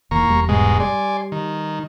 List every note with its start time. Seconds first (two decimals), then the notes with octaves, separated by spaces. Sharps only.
0.11 E1 D#3 E3 A#3 A#5 C#6
0.28 E1 E2 G3
0.49 G#2 B2 G#3
0.80 G3 D5 G#5 C6
1.32 D#3